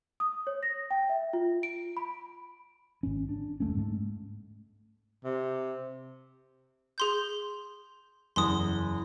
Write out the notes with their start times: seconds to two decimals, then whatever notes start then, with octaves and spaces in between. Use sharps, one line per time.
0.20 D#6
0.47 C#5
0.63 A#6
0.91 G5
1.09 E5
1.33 F4
1.63 D7
1.97 B5
3.03 G#1 C#4
3.29 D4
3.60 F1 D2 A3 C#4
3.74 G#2 A3
5.25 C3
6.98 G#4 C6 G6
8.36 F#1 E2 C6 D#6